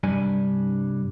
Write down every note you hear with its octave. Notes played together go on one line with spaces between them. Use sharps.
C2 G2 G3 D4 G#5